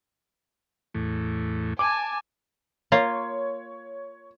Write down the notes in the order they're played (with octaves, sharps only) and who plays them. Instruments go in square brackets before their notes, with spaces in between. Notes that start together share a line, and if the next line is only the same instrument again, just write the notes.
[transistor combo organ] E2 A2
[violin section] G#5 A5 [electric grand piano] D6
[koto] A#3 F4 [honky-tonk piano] C#5